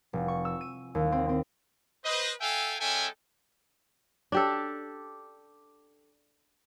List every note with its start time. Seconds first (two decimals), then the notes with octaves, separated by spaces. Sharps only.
0.13 F1
0.28 C#6
0.45 E6
0.61 D#7
0.95 D#2
1.12 C4
1.29 C4
2.04 B4 C5 D#5
2.41 A4 E5 F5 G5 G#5
2.80 G#3 C#4 A4 E5 G5 G#5
4.32 D4 G4 A4